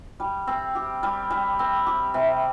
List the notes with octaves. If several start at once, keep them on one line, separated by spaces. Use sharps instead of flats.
G3
C4
G4
G3
G3
C4
G4
C3